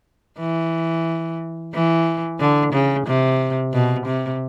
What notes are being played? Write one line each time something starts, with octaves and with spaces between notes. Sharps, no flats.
E3
E3
D3
C#3
C3
B2
C3